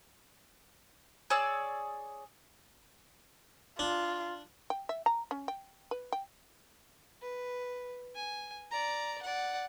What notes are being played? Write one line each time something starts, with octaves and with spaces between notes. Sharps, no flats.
G#4 C#5 D5 E6
D4 F4
G5
E5
A#5
C#4
G5
B4
G5
B4
G#5
D5 A#5
D5 F#5